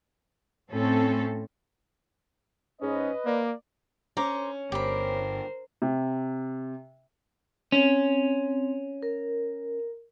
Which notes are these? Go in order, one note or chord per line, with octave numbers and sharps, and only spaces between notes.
A2 C4 C#4 A4
G#2 C#4 B4 D#5
A#3 D5
C#4 A#4 C5 D6
G1 G4 A#4 C5 B5
C3
C4 C#4
A#4